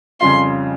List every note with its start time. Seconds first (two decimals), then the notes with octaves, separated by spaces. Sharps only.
0.21 F2 C#3 G3 C#4 F4 C6